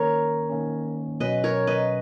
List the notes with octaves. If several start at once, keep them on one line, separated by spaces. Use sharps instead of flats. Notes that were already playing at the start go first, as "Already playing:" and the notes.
Already playing: D#3 A#3 C#4 A#4 C#5
D#3 A#3 C#4
B2 F#3 C#4 B4 D#5
A#4 C#5
B4 D#5